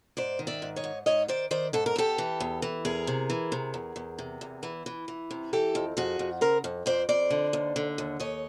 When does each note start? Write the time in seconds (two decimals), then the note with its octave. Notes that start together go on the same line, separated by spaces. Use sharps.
0.17 G#2 C5 D5
0.39 D#3
0.47 D5 E5
0.62 G#2
0.76 C#5 D#5
0.84 G#2
1.06 G#2 C#5 D#5
1.28 D#3 C5 D5
1.51 D#3 C5 D5
1.73 G#2 A4
1.86 A#4
1.96 E2 G4 A4
2.18 E3
2.40 E2
2.62 E3
2.85 E2 G#4 A#4
3.07 C3
3.30 E3
3.52 C3
3.74 E2
3.96 E2
4.18 C3
4.41 E2
4.63 E3
4.86 E3
5.08 E3
5.31 C3
5.53 E3 G4 A4
5.75 F2
5.97 F2 F#4 G#4
6.19 F2
6.41 C#3 A#4 C5
6.64 F2
6.86 F2 C5 D5
7.09 F2 C5 D5
7.30 D3
7.53 D#2
7.76 D3
7.98 D#2
8.20 D#2 C#5 D#5